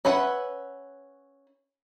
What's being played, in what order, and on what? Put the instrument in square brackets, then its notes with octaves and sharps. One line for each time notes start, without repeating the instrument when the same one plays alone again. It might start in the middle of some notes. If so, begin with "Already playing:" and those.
[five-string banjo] C#4 B4 E5 F#5